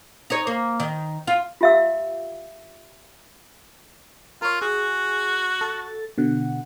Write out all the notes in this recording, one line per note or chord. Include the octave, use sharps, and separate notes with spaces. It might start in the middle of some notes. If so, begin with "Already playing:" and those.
D#4 C#5
A#3
D#3
F4
F4 G4 E5 F5 E6
F4 A#4 C#5
F#4 G#4
A4 A6
B2 D3 F#5